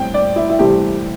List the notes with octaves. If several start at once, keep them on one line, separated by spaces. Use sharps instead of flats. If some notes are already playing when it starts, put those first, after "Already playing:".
Already playing: A2 G3 C4 G5
D5
E4
E4
C2 C3 E3 A3 C4 G4